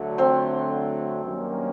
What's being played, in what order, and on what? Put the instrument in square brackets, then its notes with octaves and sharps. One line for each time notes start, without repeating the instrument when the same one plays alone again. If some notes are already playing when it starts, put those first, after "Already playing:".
Already playing: [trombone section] D2 D3 F#3 A3
[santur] C4 C5
[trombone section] G2 D#3 F#3 A#3 C#4